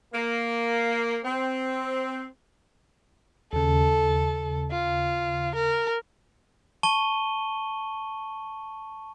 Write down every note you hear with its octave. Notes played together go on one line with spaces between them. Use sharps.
A#3
C4
D#2 C#3 A4
F4
A#4
A5 C#6 D#7 G7